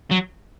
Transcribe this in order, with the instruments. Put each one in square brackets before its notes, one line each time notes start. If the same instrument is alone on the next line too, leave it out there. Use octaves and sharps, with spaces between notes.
[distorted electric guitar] F#3